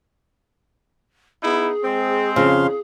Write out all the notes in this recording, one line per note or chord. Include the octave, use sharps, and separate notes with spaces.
B3 D#4 E4 G#4
G#3 C4
F2 C#3 G#4 F5 C6